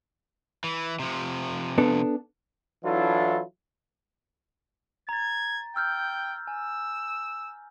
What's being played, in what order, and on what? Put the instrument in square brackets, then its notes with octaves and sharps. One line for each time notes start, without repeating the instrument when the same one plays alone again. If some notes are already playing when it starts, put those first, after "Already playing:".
[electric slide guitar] E3
C3 F3
[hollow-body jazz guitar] B3 D4 A4
[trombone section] E3 F#3 D4 E4 F4 A4
[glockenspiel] A#5 A6 [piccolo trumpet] G#6
[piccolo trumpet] G5 [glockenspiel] E6 F6 G6
[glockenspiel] G#5 [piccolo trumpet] E6